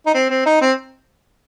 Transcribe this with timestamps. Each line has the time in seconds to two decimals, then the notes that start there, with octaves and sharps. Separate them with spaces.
0.06 D#4
0.14 C4
0.30 C4
0.46 D#4
0.61 C4